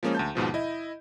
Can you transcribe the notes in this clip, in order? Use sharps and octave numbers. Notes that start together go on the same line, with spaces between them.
F3 G#3 A#3 C#4 G#4
D2 A5 G6
D#2 G#2 B2 F3
E4 D#5